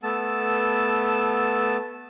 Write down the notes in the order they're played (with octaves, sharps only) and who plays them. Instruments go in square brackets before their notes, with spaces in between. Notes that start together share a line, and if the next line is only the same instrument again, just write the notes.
[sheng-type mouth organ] A3 B3 A5 E6